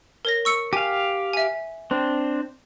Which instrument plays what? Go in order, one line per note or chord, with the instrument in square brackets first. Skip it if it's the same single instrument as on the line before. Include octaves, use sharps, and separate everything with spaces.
[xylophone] A#4 C#5 A#6
C#6 E6 C#7
[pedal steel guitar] G4 F5 [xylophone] G#5
[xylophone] E5 G#5
[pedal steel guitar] C4 D4